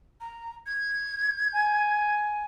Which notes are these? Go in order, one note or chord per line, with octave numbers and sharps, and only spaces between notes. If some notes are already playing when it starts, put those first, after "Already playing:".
A#5
G#6
G#5